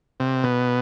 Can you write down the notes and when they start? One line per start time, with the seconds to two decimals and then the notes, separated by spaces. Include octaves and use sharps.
0.20 C3
0.44 B2